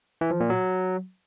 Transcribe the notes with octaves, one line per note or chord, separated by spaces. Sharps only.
E3
F3
A#2
F#3